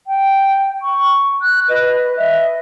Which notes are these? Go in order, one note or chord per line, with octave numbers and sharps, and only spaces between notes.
G5
C#6
F#6
B4 D#5
D#5 E5